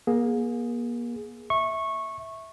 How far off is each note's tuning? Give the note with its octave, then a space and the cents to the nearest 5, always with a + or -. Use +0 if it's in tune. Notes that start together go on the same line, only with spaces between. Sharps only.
A#3 +35 G#4 +0
E5 -10 C#6 -15